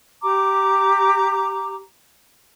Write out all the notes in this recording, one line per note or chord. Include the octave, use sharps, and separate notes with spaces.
G4 A#5 D6